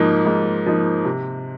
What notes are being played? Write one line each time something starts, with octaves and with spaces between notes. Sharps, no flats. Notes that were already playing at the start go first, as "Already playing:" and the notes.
Already playing: G#2 F3 A#3 D#4
G#2
F3 A#3 D#4
C3